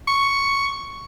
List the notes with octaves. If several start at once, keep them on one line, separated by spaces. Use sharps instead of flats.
C#6